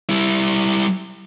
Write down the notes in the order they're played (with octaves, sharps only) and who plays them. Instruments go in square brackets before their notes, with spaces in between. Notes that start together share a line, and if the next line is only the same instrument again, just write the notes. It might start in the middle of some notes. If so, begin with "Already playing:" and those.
[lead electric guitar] G3 E4